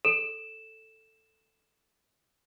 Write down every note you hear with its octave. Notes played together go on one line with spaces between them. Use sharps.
A4 E7